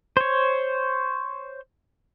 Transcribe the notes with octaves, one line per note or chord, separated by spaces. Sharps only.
C5 C#5